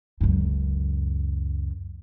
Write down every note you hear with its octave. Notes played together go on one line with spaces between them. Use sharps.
C#2 F#2